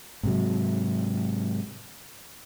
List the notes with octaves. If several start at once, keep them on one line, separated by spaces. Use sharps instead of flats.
G#2 C3 F#3